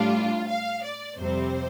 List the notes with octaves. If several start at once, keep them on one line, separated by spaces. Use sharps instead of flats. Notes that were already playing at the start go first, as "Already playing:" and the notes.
Already playing: A2 G3 D4 F4
F5
D5
F2 C3 G3 C4 C5